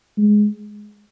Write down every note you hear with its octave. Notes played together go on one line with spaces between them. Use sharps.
G#3